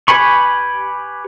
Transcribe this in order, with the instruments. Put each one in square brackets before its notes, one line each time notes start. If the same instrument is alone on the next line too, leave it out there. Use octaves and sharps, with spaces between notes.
[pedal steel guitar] G4 B4 G#5 B5 C#6